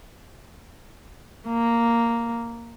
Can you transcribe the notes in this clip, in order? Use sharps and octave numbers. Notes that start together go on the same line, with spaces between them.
A#3